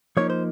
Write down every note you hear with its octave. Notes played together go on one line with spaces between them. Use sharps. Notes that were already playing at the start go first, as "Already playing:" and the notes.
F3 A#3 D#4 C#5
C5